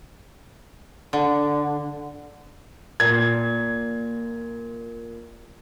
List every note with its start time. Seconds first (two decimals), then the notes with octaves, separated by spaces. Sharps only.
1.13 D3
3.00 A#2 G#6